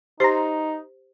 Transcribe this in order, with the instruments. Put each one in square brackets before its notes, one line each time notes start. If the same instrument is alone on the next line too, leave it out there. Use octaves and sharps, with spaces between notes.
[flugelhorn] D#4 [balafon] G4 C5 [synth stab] A#5 C6